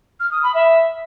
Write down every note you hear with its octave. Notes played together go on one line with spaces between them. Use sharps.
F6
D#6
B5
E5